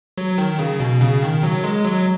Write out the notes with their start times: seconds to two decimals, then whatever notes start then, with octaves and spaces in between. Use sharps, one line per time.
0.18 F#3
0.38 D#3
0.59 C#3
0.80 B2
1.01 C#3
1.23 D#3
1.43 F#3
1.64 G#3
1.85 F#3